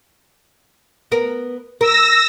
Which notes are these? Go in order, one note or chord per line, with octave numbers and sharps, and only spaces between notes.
B3 A#4
A#4 E6 A#6